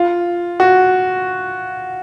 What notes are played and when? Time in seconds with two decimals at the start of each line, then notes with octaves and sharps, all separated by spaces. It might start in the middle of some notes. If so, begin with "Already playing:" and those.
Already playing: F4
0.60 F#4